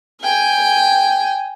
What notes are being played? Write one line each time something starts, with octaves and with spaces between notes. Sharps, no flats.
G5 G#5